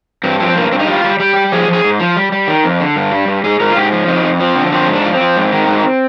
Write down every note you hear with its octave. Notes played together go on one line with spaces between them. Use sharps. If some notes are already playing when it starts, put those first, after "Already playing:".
G2 C4
F3 C4
G2 A#3
G2 C4
D#4
G3 F4
G3
G3 G4
G3
F3 G#4
F3
G#4
G#2
F3
G3
G3
D#3
F2
D3
G2
G3
G2
G#2 G#4
G#2 A#4
F4
G#2 G4
F3
F2 D#4
F2
F3 C4
D3
F3 C4
G#2
D4
F3
C4
F3
G#2
D#3
G#2